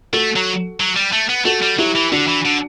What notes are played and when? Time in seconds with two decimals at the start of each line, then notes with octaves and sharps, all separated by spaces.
0.13 A3 F#4 A4
0.36 F#3
0.80 F#3
0.96 G3
1.13 A3
1.29 B3
1.45 A3 F#4 A4
1.63 G3
1.78 F#3 E4 G4
1.95 E3
2.12 D3 D4 F#4
2.28 E3
2.45 D3